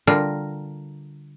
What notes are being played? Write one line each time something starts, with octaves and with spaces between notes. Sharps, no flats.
D3 G3 F4 A#4